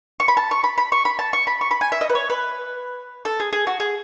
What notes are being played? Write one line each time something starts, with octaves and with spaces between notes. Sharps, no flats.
C#6
B5
A5
C#6
B5
B5
C#6
B5
A5
C#6
B5
C#6
B5
G#5
E5
D#5
B4
C#5
B4
A4
G#4
G#4
F#4
G#4